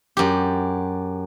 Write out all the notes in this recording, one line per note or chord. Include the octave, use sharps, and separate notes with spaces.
F#2 G4